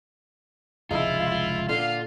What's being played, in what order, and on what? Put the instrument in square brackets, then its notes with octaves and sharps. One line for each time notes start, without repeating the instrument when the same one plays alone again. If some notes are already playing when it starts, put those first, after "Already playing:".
[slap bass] F1 C#2 [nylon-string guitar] G#3 [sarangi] E4 [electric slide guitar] F4
[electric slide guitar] F4
[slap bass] A#2 [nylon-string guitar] D3 [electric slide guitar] F4 [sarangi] F5